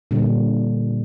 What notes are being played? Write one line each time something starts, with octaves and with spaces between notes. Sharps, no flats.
A#2 D3 G3